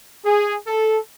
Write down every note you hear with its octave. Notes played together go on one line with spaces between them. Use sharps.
G#4
A4